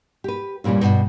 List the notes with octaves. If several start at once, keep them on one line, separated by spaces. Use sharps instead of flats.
G4 B4
F2 A#2 E3 G3 C#4
G2 B2